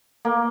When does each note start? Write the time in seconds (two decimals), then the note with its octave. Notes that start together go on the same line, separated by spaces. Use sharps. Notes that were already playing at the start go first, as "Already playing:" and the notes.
0.25 A#3